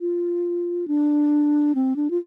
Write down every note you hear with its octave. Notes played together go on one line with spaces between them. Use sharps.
F4
D4
C4
D4
F4